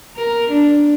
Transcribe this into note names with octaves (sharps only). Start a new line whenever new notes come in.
A#4
D4